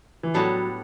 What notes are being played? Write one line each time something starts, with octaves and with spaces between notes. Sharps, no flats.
E3
A2 F#3 G3 B3 D4 A4